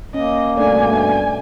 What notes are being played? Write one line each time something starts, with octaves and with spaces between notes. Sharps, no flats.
A#3 C#4 D#5
G2 B2 A3 D4 D5 G#5